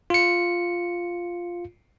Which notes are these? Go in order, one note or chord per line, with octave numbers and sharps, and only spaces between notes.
F4 C#7